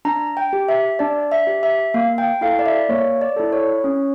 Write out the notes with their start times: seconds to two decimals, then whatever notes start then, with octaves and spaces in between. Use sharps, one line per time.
0.05 D4 A#5
0.37 G5
0.53 G4
0.68 E5
0.99 D4 D5
1.32 E5
1.47 G4
1.63 E5
1.94 A#3 F5
2.18 G5
2.41 E4 A4 F5
2.59 D5
2.66 E5
2.89 A#3 C#5
3.21 D5
3.36 E4 A4
3.53 C#5
3.84 C#4